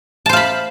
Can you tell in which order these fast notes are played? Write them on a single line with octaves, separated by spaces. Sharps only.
A5 C5 F5 B5